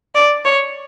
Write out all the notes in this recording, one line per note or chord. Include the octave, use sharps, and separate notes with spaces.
D5
C#5